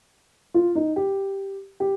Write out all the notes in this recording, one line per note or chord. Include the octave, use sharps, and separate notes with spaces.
F4
D#4
G4
G4